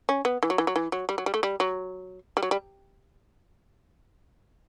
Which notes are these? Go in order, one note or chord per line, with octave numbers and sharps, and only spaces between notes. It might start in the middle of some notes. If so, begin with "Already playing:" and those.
C#4
B3
E3
F#3
E3
F#3
E3
F#3
G3
F#3
G3
A3
G3
F#3
G3
F#3
G3